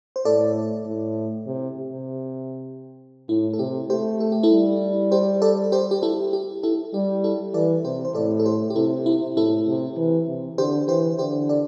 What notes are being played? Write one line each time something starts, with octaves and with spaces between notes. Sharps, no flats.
C5
A2 A4 D5
A2
C3
C3
A2 E4
A4
C3 G4
A3 G4 C5
A4
G4
E4 A4
G3
G4 C5
A4 D5
G4 C5
G4
E4 A4
G4
E4 A4
G3 G4
E4 A4
E3 A4 D5
C3 G4 C5
C5
A2 A4 D5
A4
G4 C5
G4
C3 E4 A4
E4
A2 E4 A4
C3
E3
C3
D3 G4 C5
E3 G4 C5
D3 G4 C5
A4 D5